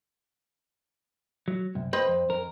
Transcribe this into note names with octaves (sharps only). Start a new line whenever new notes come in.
F#3
C2 F#2
C4 B4 C5 D#5
F2
F2 A#4